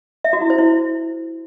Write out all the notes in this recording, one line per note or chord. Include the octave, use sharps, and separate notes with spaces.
E5
F#4
E4
C5
E4